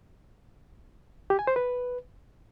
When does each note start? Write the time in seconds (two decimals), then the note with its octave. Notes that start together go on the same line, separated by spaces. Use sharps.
1.30 G4
1.39 G#5
1.47 C5
1.56 B4